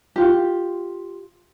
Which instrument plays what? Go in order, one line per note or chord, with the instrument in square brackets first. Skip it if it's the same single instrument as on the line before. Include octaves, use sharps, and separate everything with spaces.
[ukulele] F4 G4